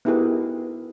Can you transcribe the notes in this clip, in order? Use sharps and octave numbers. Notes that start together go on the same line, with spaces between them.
B3 D#4 E4 G4 G#4 A#4